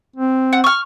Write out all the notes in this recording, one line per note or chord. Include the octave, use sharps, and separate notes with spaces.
C4
F#5
C#6 F6